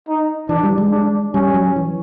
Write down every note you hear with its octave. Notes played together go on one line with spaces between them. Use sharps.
D#4
E3 D4
G3
G#3
D4
G3 C#4
F#3
E3